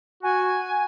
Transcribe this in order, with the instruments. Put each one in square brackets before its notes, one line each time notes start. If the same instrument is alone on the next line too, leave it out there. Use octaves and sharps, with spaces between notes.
[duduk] F#4 [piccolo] G#5